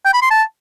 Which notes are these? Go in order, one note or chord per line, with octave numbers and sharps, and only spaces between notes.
G5
B5
C6
A5